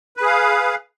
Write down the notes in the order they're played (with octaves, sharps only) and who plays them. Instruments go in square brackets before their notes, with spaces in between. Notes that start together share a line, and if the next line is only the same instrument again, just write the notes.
[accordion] B4
G#4
F5